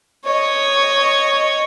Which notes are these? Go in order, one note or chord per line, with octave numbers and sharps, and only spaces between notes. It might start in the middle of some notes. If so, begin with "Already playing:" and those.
C#5 D#5